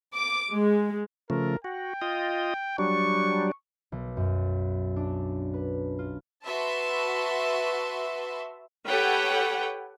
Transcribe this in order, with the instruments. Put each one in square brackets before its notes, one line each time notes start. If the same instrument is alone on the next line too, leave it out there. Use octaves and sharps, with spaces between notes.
[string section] D6
G#3
[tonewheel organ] C#3 F3 A3 [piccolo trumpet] A#4
[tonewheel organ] F#4 [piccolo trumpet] G5
[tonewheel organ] F4 D#5
[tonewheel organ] F#3 G3 D4 [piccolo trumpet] C#6
[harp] B1
F#2
D4
B4
F4
[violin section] F#4 B4 E5 A5 C6
[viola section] G4 A4 B4 C#5 F#5 G5